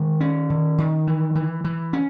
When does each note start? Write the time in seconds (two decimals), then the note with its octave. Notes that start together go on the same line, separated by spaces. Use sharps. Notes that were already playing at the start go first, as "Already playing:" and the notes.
Already playing: D#3 G#3
0.20 C#4
0.50 D#3
0.78 D#3
1.07 E3
1.35 E3
1.64 E3
1.93 C#4